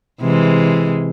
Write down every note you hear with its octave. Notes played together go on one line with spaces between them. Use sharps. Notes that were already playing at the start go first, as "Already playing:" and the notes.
C3 E3 G#3